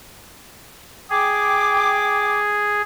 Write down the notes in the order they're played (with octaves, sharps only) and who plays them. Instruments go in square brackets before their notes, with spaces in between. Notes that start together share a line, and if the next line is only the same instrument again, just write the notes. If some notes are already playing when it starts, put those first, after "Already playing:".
[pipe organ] G#4 [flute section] G5 D6